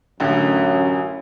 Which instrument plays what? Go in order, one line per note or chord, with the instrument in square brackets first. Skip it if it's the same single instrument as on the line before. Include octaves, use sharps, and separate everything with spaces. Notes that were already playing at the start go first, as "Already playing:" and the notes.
[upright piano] A1 D3 [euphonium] F#2